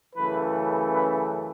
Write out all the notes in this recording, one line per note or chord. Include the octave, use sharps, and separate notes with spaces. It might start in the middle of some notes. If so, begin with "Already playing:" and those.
F#2 C#3 E3 A3 B4
B4